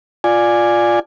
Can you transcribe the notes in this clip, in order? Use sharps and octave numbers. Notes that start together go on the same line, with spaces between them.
F4 D5 G#5